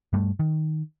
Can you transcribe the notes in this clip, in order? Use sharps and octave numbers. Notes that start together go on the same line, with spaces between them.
G2 G3 A3
D#3